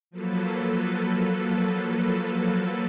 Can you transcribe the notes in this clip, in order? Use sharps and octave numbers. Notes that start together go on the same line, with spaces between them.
F3 F#3 A#3 A4 B4